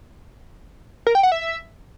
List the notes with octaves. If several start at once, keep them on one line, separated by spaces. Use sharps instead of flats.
A#4
G5
F#5
E5